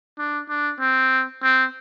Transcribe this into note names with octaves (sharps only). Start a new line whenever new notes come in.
D4
D4
C4
C4